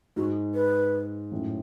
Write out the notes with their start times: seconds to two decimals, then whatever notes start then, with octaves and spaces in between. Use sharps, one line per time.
0.16 G#2 F#4
0.55 B4
1.32 F#2 A2